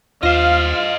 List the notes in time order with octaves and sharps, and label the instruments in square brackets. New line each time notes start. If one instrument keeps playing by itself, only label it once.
[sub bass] D#2 [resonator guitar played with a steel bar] F4 [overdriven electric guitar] C5 D#5 [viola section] F5